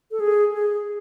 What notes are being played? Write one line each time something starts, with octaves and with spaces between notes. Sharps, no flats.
A4
G#4
G#4